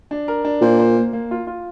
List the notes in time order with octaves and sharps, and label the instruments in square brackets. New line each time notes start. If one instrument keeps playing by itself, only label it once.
[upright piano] D4
A#4
D4
[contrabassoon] A#2 [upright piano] C5
[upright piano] C5
A#3
A#3
F4
F4